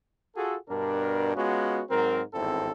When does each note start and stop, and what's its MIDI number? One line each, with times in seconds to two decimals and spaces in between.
0.36 0.56 65
0.36 0.56 66
0.36 0.56 68
0.36 0.56 69
0.69 1.35 43
0.69 1.35 47
0.69 1.35 62
0.69 1.35 70
1.35 1.81 56
1.35 1.81 59
1.35 1.81 61
1.35 1.81 65
1.35 1.81 66
1.90 2.22 44
1.90 2.22 54
1.90 2.22 60
1.90 2.22 70
2.34 2.72 32
2.34 2.72 40
2.34 2.72 43
2.34 2.72 60
2.34 2.72 64
2.34 2.72 69